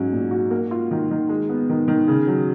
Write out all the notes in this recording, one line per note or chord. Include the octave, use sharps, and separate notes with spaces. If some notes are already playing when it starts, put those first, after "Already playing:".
Already playing: G#2 F#3 C#4
A#2
F#4
A#3
F4
D#3
D#3
G#3
B3
D#3
D#3
C#3
F#3